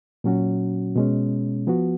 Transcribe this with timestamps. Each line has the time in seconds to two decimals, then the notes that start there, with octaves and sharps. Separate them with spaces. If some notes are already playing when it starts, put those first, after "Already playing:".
0.24 A#2 F#3 C#4 F#4
0.96 B2 G#3 C#4
1.67 F3 B3 F#4